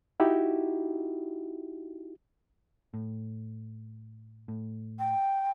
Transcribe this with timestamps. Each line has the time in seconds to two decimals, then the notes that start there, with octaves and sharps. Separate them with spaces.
0.20 D#4 E4 F#4 G4
2.94 A2
4.48 A2
4.99 G5